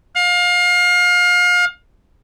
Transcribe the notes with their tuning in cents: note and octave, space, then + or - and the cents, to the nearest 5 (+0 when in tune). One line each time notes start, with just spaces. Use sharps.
F5 +30